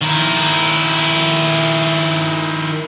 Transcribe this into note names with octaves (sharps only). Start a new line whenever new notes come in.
D#3 E4